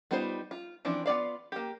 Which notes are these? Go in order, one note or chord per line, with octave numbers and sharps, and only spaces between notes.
G3 B3 D#4 F4 C5
F4
E3 F3 C4 D4
B3 F4 D5 F5
A#3 G4